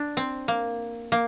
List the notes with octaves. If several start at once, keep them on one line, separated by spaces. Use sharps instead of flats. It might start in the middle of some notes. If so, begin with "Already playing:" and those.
Already playing: D4
C4
A#3
A#3